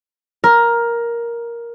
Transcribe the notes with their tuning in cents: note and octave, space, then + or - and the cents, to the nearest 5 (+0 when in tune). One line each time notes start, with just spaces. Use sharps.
A#4 +10